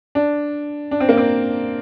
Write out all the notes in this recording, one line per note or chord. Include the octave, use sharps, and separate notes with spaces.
D4
D4
C4
A#3
C4